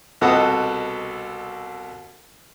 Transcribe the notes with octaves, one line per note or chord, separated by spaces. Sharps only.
C2 B2 A4 D#5 F#5 D#6